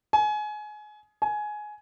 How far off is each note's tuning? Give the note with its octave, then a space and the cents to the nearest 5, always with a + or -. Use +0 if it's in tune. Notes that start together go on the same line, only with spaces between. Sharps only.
G#5 +25
G#5 +15